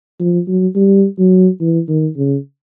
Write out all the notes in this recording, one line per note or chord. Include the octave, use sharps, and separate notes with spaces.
F3
F#3
G3
F#3
E3
D#3
C#3